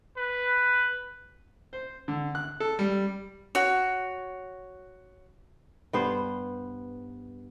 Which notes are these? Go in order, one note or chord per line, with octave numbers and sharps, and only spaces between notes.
B4
C5
D3
F#6
A4
G3
F#4 C#5
G2 B3 C5